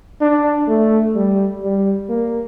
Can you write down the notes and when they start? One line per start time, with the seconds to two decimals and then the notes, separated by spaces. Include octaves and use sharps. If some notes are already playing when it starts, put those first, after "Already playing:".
0.21 D4
0.68 A3
1.16 G3
1.62 G3
2.09 A#3